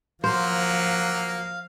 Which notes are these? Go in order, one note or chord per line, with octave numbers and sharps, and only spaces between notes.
F3 F#3 A#3 C5 F5